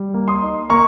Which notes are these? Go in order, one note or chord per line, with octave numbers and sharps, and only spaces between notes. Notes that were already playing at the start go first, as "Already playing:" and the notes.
Already playing: G3
A#3
C6 D#6
D#4
A#3 A#5 C#6